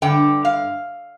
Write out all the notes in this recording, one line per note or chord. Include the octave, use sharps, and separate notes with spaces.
G2 D3 G5
F5